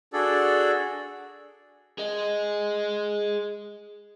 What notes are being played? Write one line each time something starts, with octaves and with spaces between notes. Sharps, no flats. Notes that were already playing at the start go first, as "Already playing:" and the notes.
D4 F#4 G#4 A4 D5
G#4 D#5